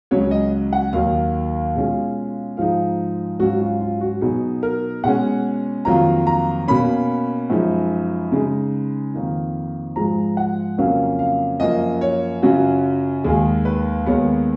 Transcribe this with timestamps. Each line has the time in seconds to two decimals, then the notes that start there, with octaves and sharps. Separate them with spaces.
0.11 C#2 C#3 F#3 C#5
0.31 D#5
0.73 F#5
0.93 D#2 D#3 F#3 F5
1.75 B2 G#3 C#4 F4
2.57 G#2 F3 G#3 D#4 F5
3.39 G#2 F#3 C#4 F4 F#4
3.60 F4
3.80 F4
4.01 F#4
4.21 B2 F#3 B3 D#4 G#4
4.63 A#4
5.04 B2 G#3 C#4 F#5
5.85 F2 D#3 F#3 A#3 F4 A#5
6.27 A#5
6.68 B2 A#3 C#4 B5
7.50 F#2 F3 G#3 D#4
8.32 C#3 G#3 D#4
9.14 F2 D#3 A#3 D#4
9.96 G#2 F3 G#3 A#5
10.37 F#5
10.78 F2 C#3 F#3 A#3 C#4 F5
11.19 F5
11.60 F#2 F3 A#3 D#5
12.01 C#5
12.42 F#2 C#3 F#3 C#4 F4 F#4
13.24 D#2 D#3 G#3 G#4
13.65 B4
14.06 D#2 D#3 G#3 B3 C#5